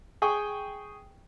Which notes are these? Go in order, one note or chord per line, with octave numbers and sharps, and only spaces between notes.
G#4 G5 G#5 C#6